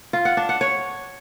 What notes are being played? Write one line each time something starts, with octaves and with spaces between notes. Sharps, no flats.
F4
F#5
D4
F#5
C#5